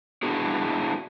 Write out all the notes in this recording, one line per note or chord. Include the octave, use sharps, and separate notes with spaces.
B3 D4 E4 F#4 G#4